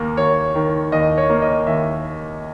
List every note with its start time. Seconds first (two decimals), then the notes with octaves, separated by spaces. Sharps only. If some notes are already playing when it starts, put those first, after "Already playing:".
Already playing: D#2 A#3
0.17 D#2 C#5
0.55 D#3
0.92 D#2 D#5
1.18 C#5
1.30 A#3
1.42 D#5
1.67 D#2 E5